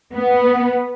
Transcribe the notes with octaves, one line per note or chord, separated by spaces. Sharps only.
B3